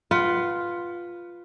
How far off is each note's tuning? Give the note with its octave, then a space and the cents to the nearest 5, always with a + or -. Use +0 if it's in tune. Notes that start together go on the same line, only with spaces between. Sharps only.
F4 +0 B4 +0 F#5 +25